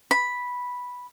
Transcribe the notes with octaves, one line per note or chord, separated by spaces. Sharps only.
B5